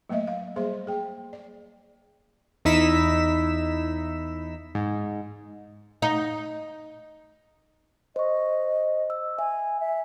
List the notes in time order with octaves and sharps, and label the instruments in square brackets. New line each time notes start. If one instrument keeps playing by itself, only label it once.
[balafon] F#3 A3 A#3 D#5 E5
F5
G3 A#3 G#4 C5 C6
G#4 G5
D5
[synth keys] E2 D#4 E4 E6 B6 E7
G#2
[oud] D#4
[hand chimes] C5 C#6 [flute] D#5
[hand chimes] E6
[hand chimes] E5 [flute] G#5
[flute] E5